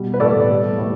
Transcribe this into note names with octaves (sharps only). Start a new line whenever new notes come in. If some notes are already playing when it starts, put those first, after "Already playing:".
Already playing: B2 G3
B4
A2 A4 D5
G3
A2